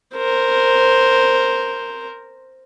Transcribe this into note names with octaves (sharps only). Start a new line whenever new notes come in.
A#4 C5